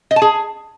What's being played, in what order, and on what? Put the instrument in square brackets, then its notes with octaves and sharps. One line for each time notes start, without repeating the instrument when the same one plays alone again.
[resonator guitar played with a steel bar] D#5
A5
G#4